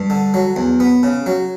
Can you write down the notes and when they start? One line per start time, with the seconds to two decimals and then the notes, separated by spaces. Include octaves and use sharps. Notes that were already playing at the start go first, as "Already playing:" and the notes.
Already playing: G2
0.10 D3
0.34 F#3
0.56 E2
0.80 B3
1.03 C#3
1.26 F#3